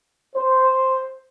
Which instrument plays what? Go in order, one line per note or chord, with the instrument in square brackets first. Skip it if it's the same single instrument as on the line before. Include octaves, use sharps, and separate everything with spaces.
[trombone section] C5